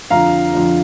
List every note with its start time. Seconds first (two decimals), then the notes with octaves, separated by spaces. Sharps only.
0.10 F2 D3 F3 F5 A#5
0.52 F2 D3 F3